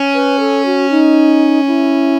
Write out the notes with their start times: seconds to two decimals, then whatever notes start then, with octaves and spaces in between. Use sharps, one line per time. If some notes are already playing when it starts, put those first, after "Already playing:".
Already playing: C#4
0.14 B4
0.40 A4
0.65 F#4
0.90 D#4
1.67 E4